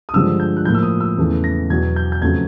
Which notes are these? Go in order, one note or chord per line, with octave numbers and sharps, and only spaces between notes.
D#6
G2 D3 F3 G#3 E6
G6
F#6
A2 F3 A#3 G6
E6
D#6
E6
E2 C#3 E3 A3
A#6
E2 B2 F#3 G#6
G6
G6
F2 C#3 F#3 A3 G#6